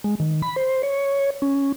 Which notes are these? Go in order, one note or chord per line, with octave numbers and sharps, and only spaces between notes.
G#3
D#3
B5
C5
C#5
C#4